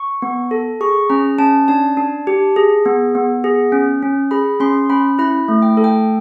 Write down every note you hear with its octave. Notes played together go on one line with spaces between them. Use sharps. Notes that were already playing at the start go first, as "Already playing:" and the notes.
Already playing: C#6
B3
A4
G#4 C#6
C#4 A#5
C#4 A5
D4 A5
D4
G4
G#4
B3
B3
G#4
C#4
C#4
G#4 B5
C#4 C6
C#4 B5
E4 B5
A3
G5
A4
G5